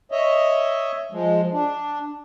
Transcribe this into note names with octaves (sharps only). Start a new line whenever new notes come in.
C#5 D#5 E5
F3 G#3
D4